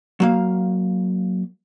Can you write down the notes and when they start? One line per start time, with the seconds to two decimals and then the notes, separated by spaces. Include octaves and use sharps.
0.20 F#3 A#3 F5